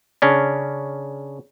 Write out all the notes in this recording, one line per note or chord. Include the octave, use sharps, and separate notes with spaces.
C#3 C#4 D4